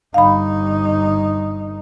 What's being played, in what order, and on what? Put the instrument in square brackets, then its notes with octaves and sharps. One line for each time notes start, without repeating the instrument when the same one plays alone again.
[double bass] G1 D#4 [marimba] F5 B5